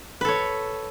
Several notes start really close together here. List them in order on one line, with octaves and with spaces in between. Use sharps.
B4 A4 C#5